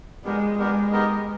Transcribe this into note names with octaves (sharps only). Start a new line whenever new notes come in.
G#3 B3 D4 G4 A#4
G#3 B3 D4 G4 A#4
B3 D#4 G4 A#4 D#5